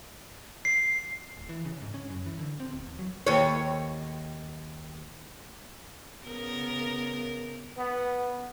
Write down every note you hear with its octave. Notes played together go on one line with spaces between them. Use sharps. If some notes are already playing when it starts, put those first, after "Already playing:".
C7
D1
E3
C#3
G#2
C#4
F#2
E3
D3
C4
D1
E2
F#3
D#2 C#5
C#3 B3 A#4
B3